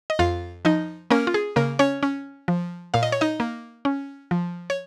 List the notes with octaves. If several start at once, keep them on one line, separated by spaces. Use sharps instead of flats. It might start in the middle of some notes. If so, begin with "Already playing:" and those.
D#5
F2 F4 F5
F3 D#4 D#5
A#3 C#4 A#4
F4
G#4
C#3 A#3 A#4
C#4 C#5
C#4
F3
A#2 F5
D#5
C#5
D#4 D#5
A#3
C#4
F3
C#5